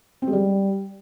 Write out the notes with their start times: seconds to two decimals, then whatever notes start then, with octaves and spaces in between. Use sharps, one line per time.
0.22 C4
0.28 G#3
0.33 G3